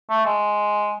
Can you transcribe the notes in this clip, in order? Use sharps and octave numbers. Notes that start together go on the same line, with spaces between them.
A3
G#3